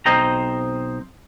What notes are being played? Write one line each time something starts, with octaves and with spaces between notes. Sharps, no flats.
B1 C4 C5 D#5 G5 A#5